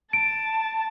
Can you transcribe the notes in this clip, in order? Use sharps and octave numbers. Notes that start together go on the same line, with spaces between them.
A5 D7